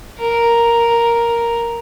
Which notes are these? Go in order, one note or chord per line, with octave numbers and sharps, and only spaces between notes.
A#4